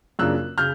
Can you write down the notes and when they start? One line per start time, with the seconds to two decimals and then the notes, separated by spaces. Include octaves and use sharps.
0.19 F#2 C#3 F3 A#3 D4 E6 F#6
0.58 C#3 F6 G6